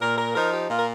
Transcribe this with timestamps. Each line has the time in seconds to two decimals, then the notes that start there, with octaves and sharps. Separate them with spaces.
0.01 A#2 A#4
0.18 A#4
0.35 F3 D#4 A#4
0.53 G4
0.70 A#2 F4
0.79 A#4